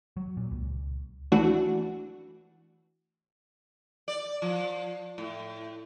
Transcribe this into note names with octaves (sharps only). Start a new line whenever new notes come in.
F#3
A#2
C#2
E3 A3 D4 F#4
D5
F3
A2